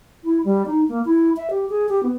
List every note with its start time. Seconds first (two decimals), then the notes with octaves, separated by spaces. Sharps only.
0.24 E4
0.44 G3
0.66 D#4
0.89 A#3
1.05 E4
1.37 E5
1.51 G4
1.70 G#4
1.89 G4
2.03 B3